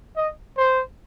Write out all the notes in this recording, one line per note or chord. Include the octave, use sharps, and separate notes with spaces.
D#5
C5